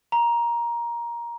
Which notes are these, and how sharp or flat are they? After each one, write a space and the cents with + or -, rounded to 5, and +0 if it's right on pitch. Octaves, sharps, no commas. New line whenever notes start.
A#5 +15